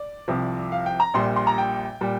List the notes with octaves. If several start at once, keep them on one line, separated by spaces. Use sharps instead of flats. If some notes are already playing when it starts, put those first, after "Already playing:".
Already playing: D5
C2 C3 F3
F5
G5
A#5
A#1 A#2 G3 C6
C6
A#5
G5
A#2 G3